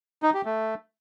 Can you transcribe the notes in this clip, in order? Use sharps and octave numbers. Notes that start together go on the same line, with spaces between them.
D#4
G4
A3